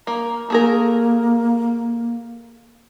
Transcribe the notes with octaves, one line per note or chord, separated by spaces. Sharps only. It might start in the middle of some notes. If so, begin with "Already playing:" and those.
A#3 A#5
A3 A#3 G#4 A#4